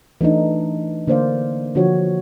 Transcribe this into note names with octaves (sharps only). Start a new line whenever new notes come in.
E3 A3 D4 D#4
D3 A#3 C5 D5 F5
D3 F3 F#4 C#5